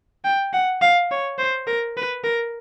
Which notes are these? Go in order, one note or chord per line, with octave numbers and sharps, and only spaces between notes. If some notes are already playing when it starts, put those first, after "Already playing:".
G5
F#5
F5
C#5
C5
A#4
B4
A#4